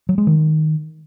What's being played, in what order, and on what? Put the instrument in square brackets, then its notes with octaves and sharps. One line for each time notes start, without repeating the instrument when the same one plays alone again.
[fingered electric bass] F#3
G#3
D#3